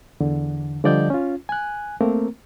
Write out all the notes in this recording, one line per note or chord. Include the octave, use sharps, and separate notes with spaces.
E2 D3
D3 F3 G3 D5 D#5 G6
C#4 F4
G#5 F#6
A3 A#3 C4 A#4